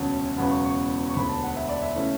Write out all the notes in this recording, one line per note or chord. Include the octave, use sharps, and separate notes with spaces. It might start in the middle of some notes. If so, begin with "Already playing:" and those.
Already playing: E1 D2 C#3 F#3 C#4 A5
E1 E2 C#3 F#3 B3 B5
C#6
C#6
C#6
E1 D2 D3 B5
A5
F#5
E5
D5
E5
C#3 E3 A3 C#4